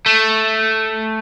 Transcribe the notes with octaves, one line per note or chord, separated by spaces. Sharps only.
A3